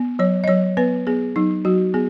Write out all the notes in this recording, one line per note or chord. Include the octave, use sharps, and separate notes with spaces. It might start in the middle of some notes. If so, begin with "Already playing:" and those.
Already playing: B3
F#3 C#5
D#5
F#3 C#5
B3 B4
B3 G#4
F#3 D#4
F#3 F#4
B3 G#4